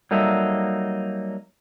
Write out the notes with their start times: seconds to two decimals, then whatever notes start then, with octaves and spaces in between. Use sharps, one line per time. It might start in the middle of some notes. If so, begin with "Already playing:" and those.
0.11 F#3 G3 A#3 D#4 A4 E5